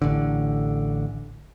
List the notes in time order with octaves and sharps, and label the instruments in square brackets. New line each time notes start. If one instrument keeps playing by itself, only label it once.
[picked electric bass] A1 D3